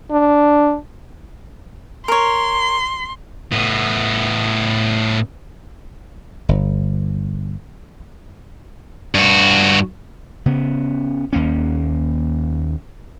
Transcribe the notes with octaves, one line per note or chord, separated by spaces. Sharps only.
D4
A#4 C#5 C6
A2 B3
G1
G2 F#4
C#3 B3
D#2 A#3 C#4